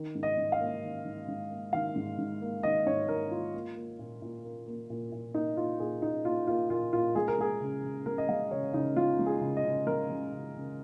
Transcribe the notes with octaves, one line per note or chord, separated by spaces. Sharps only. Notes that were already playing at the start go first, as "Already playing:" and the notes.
Already playing: D#3
G#2
D#5
G#2
F5
A#3
D#3
G#2
G#2
A#3
D#3 F5
G#2
G#2
A#3
D#3 D#5
G#2 C#5
G#2 A#4
A#3 F4
A#3
A#3
A#2
A#2
A#3
A#3
A#2
A#2
A#3 D#4
A#3 F4
A#2 G#4
A#2 D#4
A#3 F4
A#3 F4
A#2 F4
A#2 F4
G#3 G#4
A#4
G#3 G#4
C#3
C#3
G#3 A#4
D#5
G#3 F5
C#3 C#5
C#3 D#4
G#3 F4
G#3
G#4
C#3
D#5
C#3
G#3 A#4
G#3
C#3
C#3